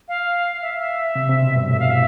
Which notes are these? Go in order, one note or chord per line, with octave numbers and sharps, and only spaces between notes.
F5
E5
E5
C3
C3
B2
G2
A2 E5
F5
E5